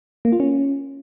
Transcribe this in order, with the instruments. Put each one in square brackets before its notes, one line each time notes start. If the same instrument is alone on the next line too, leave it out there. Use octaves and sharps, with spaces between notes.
[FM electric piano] A#3
F4
C#4